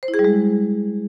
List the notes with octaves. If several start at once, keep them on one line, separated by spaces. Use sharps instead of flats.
C5
E4
G#4
G3
G#3